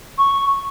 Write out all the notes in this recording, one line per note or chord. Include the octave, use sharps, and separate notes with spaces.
C#6